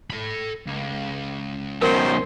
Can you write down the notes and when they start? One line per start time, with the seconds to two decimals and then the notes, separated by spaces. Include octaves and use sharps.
0.10 A4 B5
0.66 C#2
1.82 F#2 B2 D#3 A#4 C5